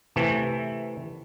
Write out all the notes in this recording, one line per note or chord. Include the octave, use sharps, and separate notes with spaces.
C3 E3 A3